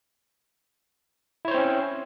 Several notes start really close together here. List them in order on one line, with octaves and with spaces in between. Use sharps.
E4 C#5 C5 C4 C#4